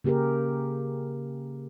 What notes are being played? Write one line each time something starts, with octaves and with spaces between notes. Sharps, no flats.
C#3 A#3 G4 G#4 A#4